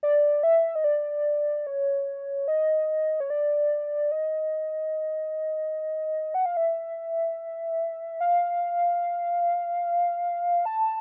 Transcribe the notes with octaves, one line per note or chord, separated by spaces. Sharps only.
D5
E5
D#5
D5
C#5
D#5
C#5
D5
D#5
F#5
F5
E5
F5
A5